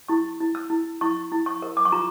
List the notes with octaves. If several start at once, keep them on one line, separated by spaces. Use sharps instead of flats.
E4 C#6
E4
E6
E4
E4 C#6
E4
C#6
A#4
D6
C#6
F4 A#5